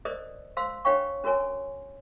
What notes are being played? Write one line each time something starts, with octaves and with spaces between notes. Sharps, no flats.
A#4 C5 D5 D#5 D#6
C5 F5 C6 E6
D4 C#5 F5 G5 C#6
C#4 F#4 A#4 C#5 G#5